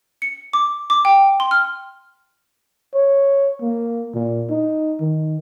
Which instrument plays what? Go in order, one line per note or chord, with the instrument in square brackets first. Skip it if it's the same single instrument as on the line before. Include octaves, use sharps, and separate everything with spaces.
[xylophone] C#7
D6
D6
G5
C6
F6
[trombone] C#5
A#3
A#2
D#4
D#3